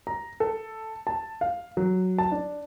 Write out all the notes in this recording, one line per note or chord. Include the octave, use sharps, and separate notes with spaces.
A#5
A4
A5
F5
F#3
A5
D4